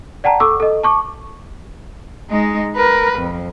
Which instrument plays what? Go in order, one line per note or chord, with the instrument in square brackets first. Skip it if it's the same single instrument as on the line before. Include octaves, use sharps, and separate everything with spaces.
[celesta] D5 F#5 G5 A5 A#5
A4 C#6 D6 E6
A4 D#5
A5 C#6 D6
[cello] G#3 D#4
A#4 B4
F2